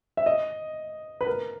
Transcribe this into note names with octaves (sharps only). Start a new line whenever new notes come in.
E5
D#5
B4
A#4